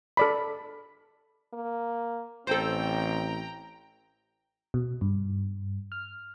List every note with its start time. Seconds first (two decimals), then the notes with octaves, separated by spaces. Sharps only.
0.17 A4 D5 B5
1.54 A#3
2.47 A1 C4 A4 C5 G5 A#5
4.74 B2
5.01 G2
5.92 F6